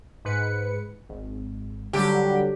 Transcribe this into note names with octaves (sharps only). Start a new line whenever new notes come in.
G#2 B4 C#7
G#1
D3 F#3 G3 G4